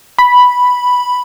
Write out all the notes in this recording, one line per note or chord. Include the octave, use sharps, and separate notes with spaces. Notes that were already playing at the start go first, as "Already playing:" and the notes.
B5